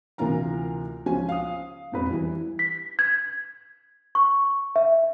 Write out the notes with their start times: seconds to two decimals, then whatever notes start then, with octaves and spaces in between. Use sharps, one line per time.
0.18 D2 C3 E3 F4 A#4 A#5
1.06 C#2 F3 C#4 G#5
1.29 F5 D#6
1.92 E1 F2 B4
2.11 E3 G3 E4
2.59 B6
2.99 G#6
4.15 C#6
4.76 E5